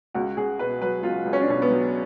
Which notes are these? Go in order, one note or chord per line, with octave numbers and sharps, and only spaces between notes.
C#2 F#4
C#2 G#4
B2 B4
F#3 B4
C#2 F4
C#2
C#4
D4
B2 C#4
B3
F#3